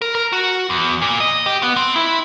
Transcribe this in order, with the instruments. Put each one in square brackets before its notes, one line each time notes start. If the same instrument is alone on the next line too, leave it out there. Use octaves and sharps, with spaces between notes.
[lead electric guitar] A#4
A#4
F#4
E2
A#2
D#5
G4
B3
C4
E4